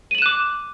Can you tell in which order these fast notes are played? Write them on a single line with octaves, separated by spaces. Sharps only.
D#7 F#7 E7 F#6 D6